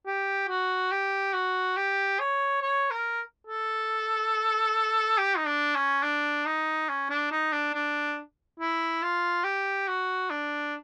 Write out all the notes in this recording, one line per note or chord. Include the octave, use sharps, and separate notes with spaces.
G4
F#4
G4
F#4
G4
C#5
C#5
A#4
A4
G4
D#4
D4
C#4
D4
D#4
C#4
D4
D#4
D4
D4
E4
F4
G4
F#4
D4